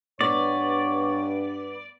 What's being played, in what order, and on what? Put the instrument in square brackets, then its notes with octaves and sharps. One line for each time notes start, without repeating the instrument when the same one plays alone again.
[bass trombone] G2 [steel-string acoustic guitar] B3 [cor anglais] C#5 [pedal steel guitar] D5